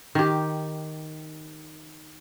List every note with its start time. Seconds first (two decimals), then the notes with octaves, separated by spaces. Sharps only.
0.15 D#3 G4